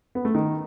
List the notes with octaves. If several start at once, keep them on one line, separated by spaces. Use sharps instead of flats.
B3
A3
D#3